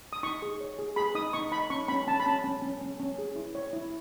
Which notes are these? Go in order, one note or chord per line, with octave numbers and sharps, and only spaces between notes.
D#6
D#4 C#6
G#4
C#5
G#4
G#4 B5
D#4 D#6
D#4 C#6
D#4 B5
C#4 C#6
C#4 B5
C#4 A5
B5
C#4 A5
C#4
C#4
C#4
C#4
G#4
E4
C#5
E4